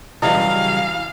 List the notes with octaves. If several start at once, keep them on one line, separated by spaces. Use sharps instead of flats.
C#3 E3 F#3 G3 E4 D#5 F5